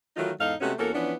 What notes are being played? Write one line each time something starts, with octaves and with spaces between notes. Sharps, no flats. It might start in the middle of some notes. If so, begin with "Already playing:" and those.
D#3 E3 F#3 A3 D#4 F4
E2 G#2 D#4 A4 F5
C3 G#3 A3 B3 C#4 F#4
E2 A#3 C#4 F#4 A4 A#4
E3 F3 B3 C#4 D4